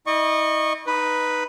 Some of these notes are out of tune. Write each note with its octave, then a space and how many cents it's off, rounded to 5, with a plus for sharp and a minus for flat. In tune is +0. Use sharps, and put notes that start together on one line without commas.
E4 -45 D#5 -30 C#6 -10
D#4 +0 B4 +0